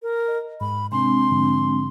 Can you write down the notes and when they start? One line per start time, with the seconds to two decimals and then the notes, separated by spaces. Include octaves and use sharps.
0.02 A#4
0.28 D#5
0.61 G#2 B5
0.92 C3 G#3 C4 D4 C6
1.30 G#2 D3 F3